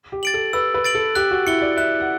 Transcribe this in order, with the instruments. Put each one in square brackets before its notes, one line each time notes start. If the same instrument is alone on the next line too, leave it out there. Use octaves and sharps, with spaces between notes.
[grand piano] G4
[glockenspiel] A6 D7 F#7
[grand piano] A4
[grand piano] B4 [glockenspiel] E6
[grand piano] B4
[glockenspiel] A6 D7 F#7
[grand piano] A4
[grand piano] G4 [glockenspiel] F#6
[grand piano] F#4
[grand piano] E4 [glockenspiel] C#7 G7
[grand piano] D5
[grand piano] E5 [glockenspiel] F#6
[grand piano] F#5